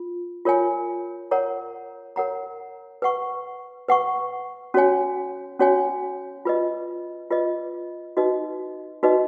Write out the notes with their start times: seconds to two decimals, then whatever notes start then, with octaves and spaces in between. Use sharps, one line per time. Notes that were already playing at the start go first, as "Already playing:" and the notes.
Already playing: F4
0.45 F4 A#4 C#5 G#5
1.31 A#4 C#5 F#5 A#5
2.16 A#4 C#5 F#5 A#5
3.02 B4 F#5 C#6
3.88 B4 F#5 C#6
4.74 C#4 F#4 C#5 G#5
5.60 C#4 F#4 C#5 G#5
6.45 F4 B4 D#5
7.31 F4 B4 D#5
8.17 D#4 F#4 B4 D#5
9.03 D#4 F#4 B4 D#5